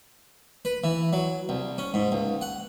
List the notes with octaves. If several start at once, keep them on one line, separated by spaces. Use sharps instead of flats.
B4
E3
F#3
C2
C#4
G#2
C#2
F#5